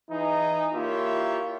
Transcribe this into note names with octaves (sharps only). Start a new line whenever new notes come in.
E3 D#4 G#4
A#3 E4 F4 G4 C#5 E5